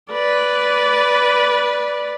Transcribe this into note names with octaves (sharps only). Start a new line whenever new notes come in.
B4 D5